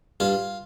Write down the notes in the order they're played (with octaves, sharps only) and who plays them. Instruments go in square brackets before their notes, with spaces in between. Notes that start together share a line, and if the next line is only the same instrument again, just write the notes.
[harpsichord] G2 F4